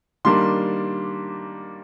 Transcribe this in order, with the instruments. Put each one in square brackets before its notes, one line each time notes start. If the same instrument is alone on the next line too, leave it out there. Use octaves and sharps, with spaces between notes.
[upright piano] D#3 G3 A#3 D4 C6